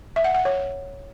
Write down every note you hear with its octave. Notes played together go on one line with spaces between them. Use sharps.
E5
F#5
F#5
C#5